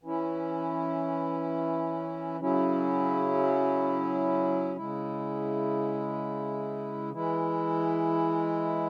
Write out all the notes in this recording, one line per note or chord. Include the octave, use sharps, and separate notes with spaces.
E3 C#4 E4
C#3 F#3 C#4 E4
C#3 G#3 E4
E3 G#3 E4